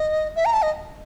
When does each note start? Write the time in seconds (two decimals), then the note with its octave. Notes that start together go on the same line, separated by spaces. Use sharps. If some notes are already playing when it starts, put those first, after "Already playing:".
Already playing: D#5
0.36 E5
0.45 A#5
0.53 A5
0.62 D#5